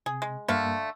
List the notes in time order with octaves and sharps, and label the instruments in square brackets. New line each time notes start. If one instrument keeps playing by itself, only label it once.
[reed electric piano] C3 [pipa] G#4
[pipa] G#3
[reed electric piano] G2 A#3 [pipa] D3 A3 F5